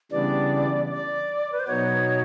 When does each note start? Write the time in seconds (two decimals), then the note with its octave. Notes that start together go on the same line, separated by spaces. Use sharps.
0.11 C#3 E3 G3 B3 D4 D5
0.90 D5
1.52 B4
1.60 C5
1.67 B2 F#3 B3 D#4 F#4 C#5